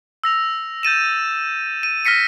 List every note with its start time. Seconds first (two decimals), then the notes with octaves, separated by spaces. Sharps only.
0.24 E6 A#6 F7
0.83 G6 A6 D#7 E7
1.83 D#7
2.05 F6 A#6 B6 C#7 D#7